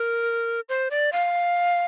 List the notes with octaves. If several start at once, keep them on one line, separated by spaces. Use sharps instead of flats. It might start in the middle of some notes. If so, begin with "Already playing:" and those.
Already playing: A#4
C5
D5
F5